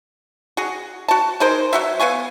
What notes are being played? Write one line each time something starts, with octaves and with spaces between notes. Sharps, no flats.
F#4 G#4
F#4 A5
D#4 G#4 A#4 C5
F#3 F#4 E5
B3 F5 G#5 C#6